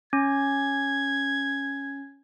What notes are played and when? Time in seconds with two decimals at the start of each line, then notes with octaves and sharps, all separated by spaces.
0.13 C#4 G#6